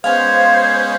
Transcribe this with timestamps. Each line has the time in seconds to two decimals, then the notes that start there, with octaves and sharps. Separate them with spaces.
0.04 G#3 B3 C#4 C5 F5 G#5 G#6